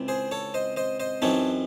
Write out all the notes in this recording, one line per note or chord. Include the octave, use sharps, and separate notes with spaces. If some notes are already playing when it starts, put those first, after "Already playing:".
Already playing: C#2 C3 C4 E4
G#4 C5
A4 C#5
C5 D#5
C5 D#5
C5 D#5
F#2 E3 C4 D#4 A4 C#5